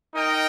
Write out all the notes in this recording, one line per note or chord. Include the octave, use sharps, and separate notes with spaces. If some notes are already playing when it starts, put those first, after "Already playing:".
D#4 A#4 D#5 G5